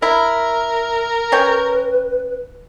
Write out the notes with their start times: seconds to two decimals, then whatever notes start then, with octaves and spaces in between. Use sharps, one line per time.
0.02 E4 A#4
1.32 C#4 B4 C#5 G5